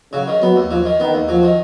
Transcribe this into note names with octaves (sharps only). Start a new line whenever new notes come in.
C#3 F#3
D#3
F#3 B3
D#2
F3 F#3
D#3
D#3 B3
D#2
F3 F#3
D#3